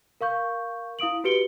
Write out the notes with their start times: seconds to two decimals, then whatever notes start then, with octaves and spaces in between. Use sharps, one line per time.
0.21 A#4 F5 C#6 G6
0.99 E4 F5 D#6 D7 F#7
1.24 F#4 G4 B4 C#7 D7 G7